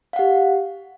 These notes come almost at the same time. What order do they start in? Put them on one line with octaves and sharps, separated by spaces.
F5 F#5 G4